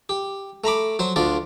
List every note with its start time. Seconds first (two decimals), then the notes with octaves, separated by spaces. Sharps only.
0.09 G4
0.64 A3 A#5 B5 D6
0.99 F#3 C5
1.16 D2 D3 F4 D5